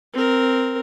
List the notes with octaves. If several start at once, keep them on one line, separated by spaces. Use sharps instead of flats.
C4 A#4